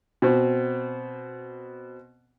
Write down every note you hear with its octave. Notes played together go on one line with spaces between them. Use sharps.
B2 C4